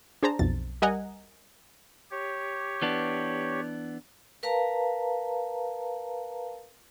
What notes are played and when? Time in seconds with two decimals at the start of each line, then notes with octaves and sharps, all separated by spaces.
0.23 D4 G#4 C5 A5 A#5
0.39 B1 F2 A6
0.82 G3 A#4 D#5 F#5 G#5 A#5
2.11 G4 C#5
2.82 E3 B3 D4
4.43 A#4 B4 F5 A5 A#5